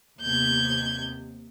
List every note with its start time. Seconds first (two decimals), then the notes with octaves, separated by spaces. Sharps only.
0.21 D#2 C3 B3 G6 G#6